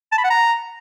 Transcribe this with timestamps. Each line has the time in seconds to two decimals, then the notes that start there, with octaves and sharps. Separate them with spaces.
0.12 A5
0.18 B5
0.24 F#5
0.30 A#5